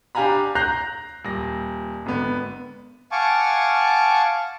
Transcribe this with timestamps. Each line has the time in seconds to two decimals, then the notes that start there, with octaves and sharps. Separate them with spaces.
0.15 D4 G4 F5 G#5 A#5 B5
0.55 A#5 F#6 G6 A#6 C7 F7
1.25 D#1 A#6
2.06 G#1 D3 B3
3.12 F5 F#5 G#5 A5 C#6 D6